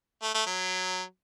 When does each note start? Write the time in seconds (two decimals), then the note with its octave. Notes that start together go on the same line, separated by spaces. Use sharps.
0.23 A3
0.34 A3
0.46 F#3